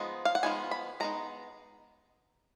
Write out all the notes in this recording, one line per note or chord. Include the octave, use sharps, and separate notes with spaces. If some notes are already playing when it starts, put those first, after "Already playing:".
Already playing: F3 G#3 B3 D#4
F5
F#5
F3 G#3 B3 D#4 G#5
B5
G#3 B3 D#4 A#5